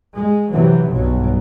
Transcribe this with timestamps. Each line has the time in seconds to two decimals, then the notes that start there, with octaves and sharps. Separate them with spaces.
0.15 G#3
0.51 C3 E3 F#3
0.92 B1 G2 F#3